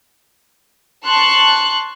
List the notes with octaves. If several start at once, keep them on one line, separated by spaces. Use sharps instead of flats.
A5 C6 C#6 F#6